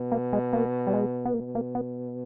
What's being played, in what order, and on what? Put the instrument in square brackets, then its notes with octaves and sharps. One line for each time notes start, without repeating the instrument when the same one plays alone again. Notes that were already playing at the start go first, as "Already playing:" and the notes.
Already playing: [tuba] B2
[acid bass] A#3
G#3
A#3
G3
G#3
B3
[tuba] B2 [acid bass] A#3
[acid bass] A#3
B3